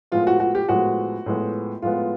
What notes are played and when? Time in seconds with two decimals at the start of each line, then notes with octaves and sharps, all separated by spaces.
0.12 A2 F3 G#3 B3 F4
0.27 F#4
0.40 F#4
0.55 G4
0.69 A2 F3 G#3 B3 F#4
1.26 A2 F3 G#3 B3
1.82 A2 F3 G#3 B3 F4